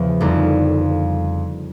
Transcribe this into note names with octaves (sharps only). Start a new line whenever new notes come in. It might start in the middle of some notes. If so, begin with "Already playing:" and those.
Already playing: E2 C#3 F3
F2 D3 G3 A#3 D#4